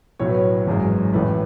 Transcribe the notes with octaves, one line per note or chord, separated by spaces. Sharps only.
B1 A2 F#3 C#5
B4
C#5
G#1 F#2 E3 G#3
A1 A2 E3 A3 B4